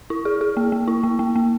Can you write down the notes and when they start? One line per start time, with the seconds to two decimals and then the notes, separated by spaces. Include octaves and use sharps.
0.10 E4
0.25 G#4
0.41 G#4
0.57 A#3
0.72 A#3
0.88 E4
1.03 A#3
1.19 A#3
1.36 A#3